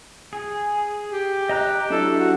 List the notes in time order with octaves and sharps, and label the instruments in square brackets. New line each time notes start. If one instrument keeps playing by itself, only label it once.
[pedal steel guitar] G#4
[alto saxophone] G4
[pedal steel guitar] D#5 A#5 F#6
[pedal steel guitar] F#3 D4 E4 [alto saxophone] A4
[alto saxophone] F#4